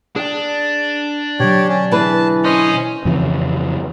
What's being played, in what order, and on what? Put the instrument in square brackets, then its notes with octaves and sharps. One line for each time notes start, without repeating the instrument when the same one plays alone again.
[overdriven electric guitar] D4 [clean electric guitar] G#4 G5
[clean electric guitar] B2 D3 F#3 [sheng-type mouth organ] G4 C#5
[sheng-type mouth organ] C#4
[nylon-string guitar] E3 G#4 B4 [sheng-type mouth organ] A5
[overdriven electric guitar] C#4 [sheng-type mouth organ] C5 D#5
[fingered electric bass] F2 C#3 E3 C4